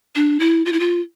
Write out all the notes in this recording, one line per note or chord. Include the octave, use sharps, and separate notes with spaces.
D4
E4
F4
E4
F4